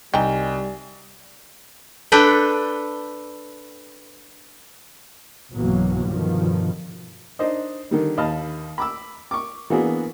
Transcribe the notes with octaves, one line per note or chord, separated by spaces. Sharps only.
C2 G3 D#4 G5 G#5
D4 A4 B4 G5
B1 G2 B2 E3 F#3 A#3
G2 B2 D3 D#3 F3 G3
D4 D#4 C5 D#5
D3 D#3 G3
D#2 D#5 F5 A5 B5 F6
B5 D6 E6
C#6 D6
E3 A#3 B3 D4 F#4 G#4